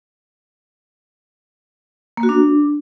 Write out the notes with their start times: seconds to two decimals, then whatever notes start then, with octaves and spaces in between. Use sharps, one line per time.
2.17 A#3
2.23 F#4
2.29 D4